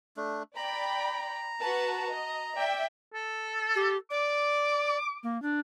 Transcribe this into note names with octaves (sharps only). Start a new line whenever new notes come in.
A3 D4
D5 G5 A#5 B5
F#4 B4 A5
D#5
D5 E5 G5
A4
G4
D5 D6
A#3
D4